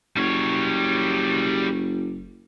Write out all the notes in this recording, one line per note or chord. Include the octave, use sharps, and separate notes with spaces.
F#1 G3 C#5